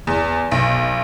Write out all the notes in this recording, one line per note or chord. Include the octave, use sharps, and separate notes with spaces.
E2
B1